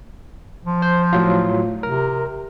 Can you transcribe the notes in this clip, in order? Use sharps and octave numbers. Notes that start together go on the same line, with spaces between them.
F3
C5
A2 F#3 F4
C3 A#4